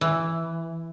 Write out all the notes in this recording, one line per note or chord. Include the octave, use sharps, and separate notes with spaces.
E3